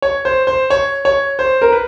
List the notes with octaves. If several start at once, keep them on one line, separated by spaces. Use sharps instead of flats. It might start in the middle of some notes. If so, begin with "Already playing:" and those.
C#5
C5
C5
C#5
C#5
C5
A#4
B4